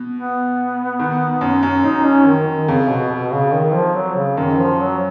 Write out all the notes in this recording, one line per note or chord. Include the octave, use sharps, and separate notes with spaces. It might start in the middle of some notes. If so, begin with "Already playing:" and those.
Already playing: B2
B3
D#3
F#2
F#2
F#2 D#4
C#4
D#3
D#3
F2 C#3
B2
B2
C#3
D#3
F3
F#3
C#3
F#2 D#3
D#3
F3
F#3